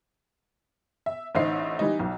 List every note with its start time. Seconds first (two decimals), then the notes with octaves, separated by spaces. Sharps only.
1.06 E5
1.35 A1 D3 D#4 C5 E5 C7
1.79 E3 G3 D#4
2.00 B1